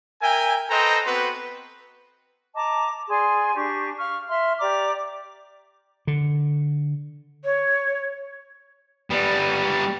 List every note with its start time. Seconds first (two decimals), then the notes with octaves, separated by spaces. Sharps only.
0.21 A#4 E5 G5 G#5
0.71 A4 B4 C5 D#5 G5 A#5
1.06 B3 C4 F#4 B4 C5
2.55 D#5 A5 A#5 D6
3.09 G#4 D5 G#5 C6
3.55 D4 G4 C#6
3.99 F5 C#6 F6
4.29 E5 C6 F6
4.59 G4 D5 A#5 D6
6.07 D3
7.44 C#5
9.10 G3 B3